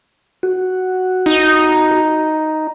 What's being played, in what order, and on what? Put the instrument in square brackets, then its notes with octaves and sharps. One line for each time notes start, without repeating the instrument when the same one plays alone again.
[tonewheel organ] F#4
[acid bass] D#4